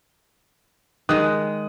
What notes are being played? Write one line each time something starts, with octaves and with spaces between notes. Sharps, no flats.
D#3 G#3 D#6 F#6